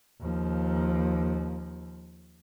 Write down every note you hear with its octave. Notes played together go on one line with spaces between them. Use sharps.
D#2 F3